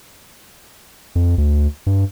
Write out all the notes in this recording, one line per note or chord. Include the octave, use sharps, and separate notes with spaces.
F2
D2
G2